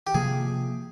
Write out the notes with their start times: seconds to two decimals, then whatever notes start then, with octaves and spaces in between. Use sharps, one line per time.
0.07 G4
0.14 C3 F3 A#3 G#4